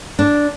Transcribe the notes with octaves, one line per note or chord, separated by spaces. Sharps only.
D4